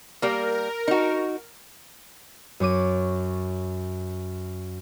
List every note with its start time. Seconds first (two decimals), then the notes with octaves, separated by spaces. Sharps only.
0.22 G3 A#3 A#4
0.88 D#4 F#4
2.60 F#2 C#5 D6 D#7